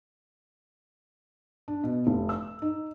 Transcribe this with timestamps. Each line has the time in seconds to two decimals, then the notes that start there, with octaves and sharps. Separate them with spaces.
1.68 D4
1.84 B2
2.07 F1
2.29 E6
2.62 D#4